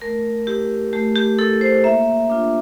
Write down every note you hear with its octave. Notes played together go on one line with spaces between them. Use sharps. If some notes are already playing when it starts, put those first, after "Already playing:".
A3 A#4
E4 G4
A3 G4
G4
E4 A4
C5
A#3 E5
D4 F4